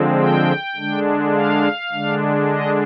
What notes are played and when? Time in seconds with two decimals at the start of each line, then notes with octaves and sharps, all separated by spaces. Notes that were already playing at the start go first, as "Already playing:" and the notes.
Already playing: D3 F3 G#3 C4
0.18 G5
0.76 D3 G#3 D4
1.34 F5
1.91 D3 G#3 D4
2.50 D#5